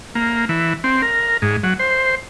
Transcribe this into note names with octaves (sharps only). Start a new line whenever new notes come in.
A#3
E3
C4
A#4
G#2
F#3
C5